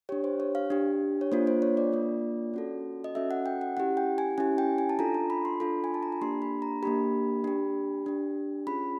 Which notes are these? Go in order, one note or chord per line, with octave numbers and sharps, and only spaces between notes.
D4 G4 C#5
C5
C#5
F5
D4 G4
C#5
A#3 D4 F4 C5
C5
C#5
D5
A#3 D4 F4
C#4 F#4 A4
D#5
C#4 F#4 A4 E5
F#5
G5
F#5
C#4 E4 G4 F#5
G5
G#5
C#4 E4 G4 G#5
G5
G#5
A5
D4 F4 A4 A#5
A#5
B5
C6
D4 F4 A4 B5
G#5
A5
A#5
B5
A#3 D4 G4 C6
B5
A#5
A#3 D4 G4 B5
D4 G4
D4 G4
C#4 F4 G#4 B5